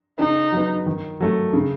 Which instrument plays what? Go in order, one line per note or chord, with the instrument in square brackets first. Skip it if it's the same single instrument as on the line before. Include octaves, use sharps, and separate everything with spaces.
[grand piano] C#3 [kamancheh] D#4
[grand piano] F#3 B3
D#3
F#3 A3
C#3